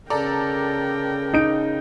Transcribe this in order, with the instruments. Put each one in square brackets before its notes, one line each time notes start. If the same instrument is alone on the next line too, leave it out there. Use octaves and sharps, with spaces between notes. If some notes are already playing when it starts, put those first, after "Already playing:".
[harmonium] C#3 [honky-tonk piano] A4 D5 A#5 [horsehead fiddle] A#4 G5
[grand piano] D#4 D7